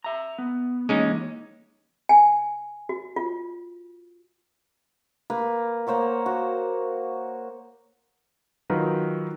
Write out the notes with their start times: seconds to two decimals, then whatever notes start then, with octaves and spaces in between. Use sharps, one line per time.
0.04 E5 A#5
0.38 B3
0.89 E3 G#3 A#3 C#4 D#4
2.09 G#5
2.89 F#4
3.16 F4
5.30 A#3 B4 B5
5.87 A#3 C5 C#5 F#5
6.26 F#4
8.70 D#3 F#3 D#4 F4 A#4 B4